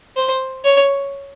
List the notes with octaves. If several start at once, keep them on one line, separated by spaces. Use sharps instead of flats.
C5
C#5